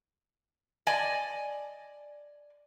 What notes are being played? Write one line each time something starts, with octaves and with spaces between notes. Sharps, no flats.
D5 D#5 G#5